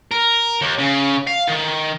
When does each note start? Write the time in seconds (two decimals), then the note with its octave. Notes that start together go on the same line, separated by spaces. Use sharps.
0.11 A#4
0.61 D#2
0.78 C#3
1.27 F5
1.47 D#3